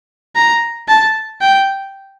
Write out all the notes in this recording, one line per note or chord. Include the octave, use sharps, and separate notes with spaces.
A#5
A5
G5